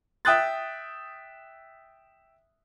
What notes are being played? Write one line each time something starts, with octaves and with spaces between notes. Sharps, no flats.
E5 G5 D#6 F#6 A6